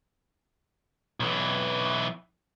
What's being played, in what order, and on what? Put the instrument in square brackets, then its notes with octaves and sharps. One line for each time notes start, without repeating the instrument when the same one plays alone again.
[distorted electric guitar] B1 E3